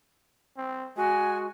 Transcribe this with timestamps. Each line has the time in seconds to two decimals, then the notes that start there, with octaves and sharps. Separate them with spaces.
0.57 C4
0.97 G#3 F#4 G#5